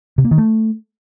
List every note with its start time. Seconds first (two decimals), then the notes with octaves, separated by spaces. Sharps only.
0.18 C3
0.25 A#3
0.31 D#3
0.38 A3